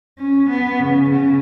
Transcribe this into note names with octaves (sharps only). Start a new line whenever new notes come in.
C#4
B3
C#3
C#3